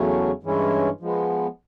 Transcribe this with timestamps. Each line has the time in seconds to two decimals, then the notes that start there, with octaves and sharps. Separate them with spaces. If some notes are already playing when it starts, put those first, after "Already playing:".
Already playing: E2 C#3 F#3 A3 C#4
0.43 G2 E3 G#3 C#4 E4
1.01 F3 G#3 B3